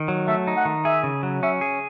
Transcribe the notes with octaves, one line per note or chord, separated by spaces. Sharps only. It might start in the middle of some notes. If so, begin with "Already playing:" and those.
Already playing: D#3
F#3
A3 E5
D#4
F#5
D#3
G#4 E5
C#3
F#3
C#4 E5
G#4